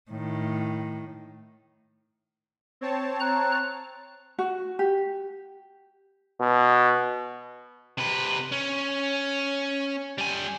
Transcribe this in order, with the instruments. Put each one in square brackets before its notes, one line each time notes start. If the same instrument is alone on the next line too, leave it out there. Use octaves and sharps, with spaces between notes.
[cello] A2 D#3
[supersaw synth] C4 C#5 A5
[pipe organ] A#5 F#6
[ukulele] F#4
G4
[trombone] B2
[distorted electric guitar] C3 B4
C#4
G3 G#5